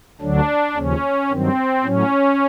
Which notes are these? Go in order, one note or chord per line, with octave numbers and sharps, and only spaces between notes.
D2 D3 F#3 D4
D#2 C#3 F3 C#4
G2 D#3 F#3 C4
A2 F#3 C#4